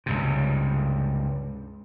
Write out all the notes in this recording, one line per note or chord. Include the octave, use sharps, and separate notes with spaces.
C#2 G2 C3